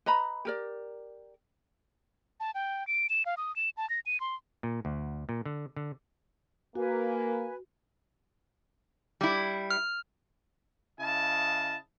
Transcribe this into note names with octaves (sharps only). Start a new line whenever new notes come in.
B4 D#5 A#5 B5
G4 A#4 D5
A5
G5
D7
E7
F5
D#6
E7
A5
A#6
D#7
C6
A#2
D2
A#2
D3
D3
A#3 F#4 B4 G#5
G3 E4
F6
C#3 E4 D#5 F5 A5